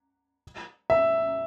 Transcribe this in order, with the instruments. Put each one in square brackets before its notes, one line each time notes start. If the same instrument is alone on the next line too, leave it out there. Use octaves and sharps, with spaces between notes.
[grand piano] E5